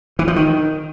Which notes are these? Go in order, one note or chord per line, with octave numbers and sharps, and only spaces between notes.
E3
F3
D#3